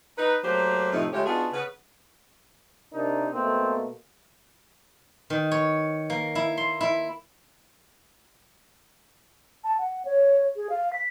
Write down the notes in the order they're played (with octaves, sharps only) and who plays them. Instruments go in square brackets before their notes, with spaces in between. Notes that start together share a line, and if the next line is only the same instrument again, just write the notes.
[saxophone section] D#4 B4
F#3 A3 A#3 G4 C5
F2 A2 C3 A3 D#4
C#3 G#3 A3 F4 G4 C#5
B3 D4 D#4 F4 F#4 G#4
C#3 B3 B4
[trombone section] C3 D4 A#4 [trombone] D#4
[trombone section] B2 A3 A#3 [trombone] C4
[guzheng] D#3
C#5
A#3
E4
C6
E4
[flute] A5
F#5
C#5
G#4
F5
B6